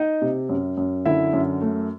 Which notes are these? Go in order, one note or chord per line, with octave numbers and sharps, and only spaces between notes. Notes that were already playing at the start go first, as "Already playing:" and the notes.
Already playing: D#4 D#5
C3
F#2
F#2
D3 E4 E5
F#2
A3